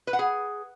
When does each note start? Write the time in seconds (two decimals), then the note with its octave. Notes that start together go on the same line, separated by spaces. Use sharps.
0.07 B4
0.13 F#5
0.19 G#4